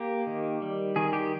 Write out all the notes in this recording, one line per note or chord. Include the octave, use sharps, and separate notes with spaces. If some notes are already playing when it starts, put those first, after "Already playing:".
Already playing: A#3 G4
D#3
G3
D#3 G#4
G4